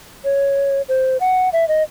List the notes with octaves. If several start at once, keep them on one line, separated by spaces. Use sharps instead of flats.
C#5
C5
F#5
E5
D#5